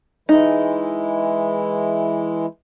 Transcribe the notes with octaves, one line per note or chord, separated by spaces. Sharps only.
E3 G#3 D#4 E4